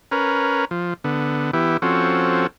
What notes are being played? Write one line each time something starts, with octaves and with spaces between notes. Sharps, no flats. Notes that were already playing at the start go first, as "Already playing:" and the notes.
C#4 A#4 B4
F3
D3 B3
E3 B3 E4 G4
F3 C4 C#4 F#4 A4